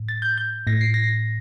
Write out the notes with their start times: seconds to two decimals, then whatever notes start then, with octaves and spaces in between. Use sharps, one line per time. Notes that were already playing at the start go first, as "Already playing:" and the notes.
Already playing: A2
0.09 A6
0.22 G6
0.38 G6
0.67 A2 A#6
0.81 C7
0.94 A#6